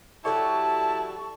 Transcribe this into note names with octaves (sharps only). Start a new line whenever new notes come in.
F#3 E4 G4 A4 D5 A5 C#6